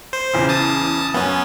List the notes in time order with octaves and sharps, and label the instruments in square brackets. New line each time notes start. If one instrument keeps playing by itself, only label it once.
[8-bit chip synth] C5
[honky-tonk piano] E2 C#3
[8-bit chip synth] A5 D#6
[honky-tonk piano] F#2 [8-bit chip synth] B3 C#4